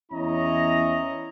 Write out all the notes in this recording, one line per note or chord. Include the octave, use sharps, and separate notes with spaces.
E2 C#4 E4 C#5 D#5 A#5